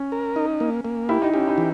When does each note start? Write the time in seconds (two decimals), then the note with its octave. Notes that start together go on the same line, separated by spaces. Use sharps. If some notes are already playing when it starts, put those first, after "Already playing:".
Already playing: C#4
0.12 A#4
0.36 D#4
0.60 A#3
0.85 A#3
1.09 E4 G4
1.22 D#4
1.34 C#4 G4
1.48 D#4
1.58 E3